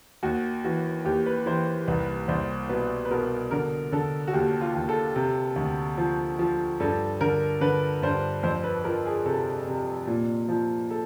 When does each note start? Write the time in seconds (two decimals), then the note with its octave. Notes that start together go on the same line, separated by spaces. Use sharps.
0.23 D#2 F#4
0.64 E3 F#4
1.05 D#2 G4
1.26 B4
1.46 E3 C5
1.88 C2 B4
2.28 C2 C5
2.69 B2 B4
3.05 B4
3.11 B2 A#4
3.51 D3 A#4
3.92 D3 A4
4.27 F#4
4.33 D#2 G4
4.61 F4
4.74 D#2
4.89 A4
5.16 C3
5.56 D2
5.98 F3
6.39 F3
6.80 G2 A4
7.21 D3 A#4
7.61 D3 B4
8.02 G2 C5
8.43 F2 C5
8.64 B4
8.84 F3 A#4
9.05 G#4
9.26 C3 A4
9.67 C3
10.07 A#2
10.48 F3
10.90 A4